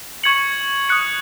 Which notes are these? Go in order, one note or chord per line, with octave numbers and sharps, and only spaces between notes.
C#6 G#6 C#7 F#7
D#6 F#6 C#7